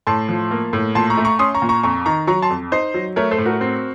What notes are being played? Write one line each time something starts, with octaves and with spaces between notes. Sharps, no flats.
A2 A5 C6
F3
A#3
A2
A#2 A5 C6
A#5 C#6
A3
A#5 C#6
C#4 C6 D#6
A#5 C#6
A#2
A#5 C#6
F2 A#5 C#6
D#3 A#5 C#6
F#3 A#5 C#6
A5 C6
F2
D#4 C5 D#5
F#3
A3 A#4 C#5
A4 C5
A2
F#4 A#4
C4